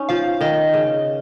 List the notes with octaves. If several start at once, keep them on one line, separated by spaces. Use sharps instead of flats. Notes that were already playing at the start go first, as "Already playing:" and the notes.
Already playing: C#4 D#4
F3 F5
D#3 D#5
C#3